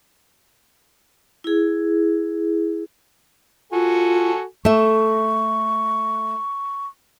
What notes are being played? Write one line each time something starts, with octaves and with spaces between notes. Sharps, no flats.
E4 G#4
F4 F#4 A4 G#5
A3 E5 C#6